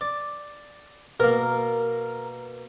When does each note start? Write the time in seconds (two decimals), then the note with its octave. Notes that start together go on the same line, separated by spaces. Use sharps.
0.01 D5
1.20 B2 A#3 A#4